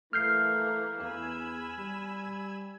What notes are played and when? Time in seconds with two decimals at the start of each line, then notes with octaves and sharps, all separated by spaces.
0.13 E3 A3 A#3 F6 G6 C7
1.02 E2 G#5 B5 E6
1.79 G3